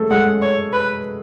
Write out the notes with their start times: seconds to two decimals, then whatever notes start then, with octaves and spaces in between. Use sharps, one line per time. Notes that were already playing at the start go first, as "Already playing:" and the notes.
Already playing: F#3 G#3 A3 G#4 A4
0.10 G#3 G#4 F#5
0.42 C#5
0.73 B4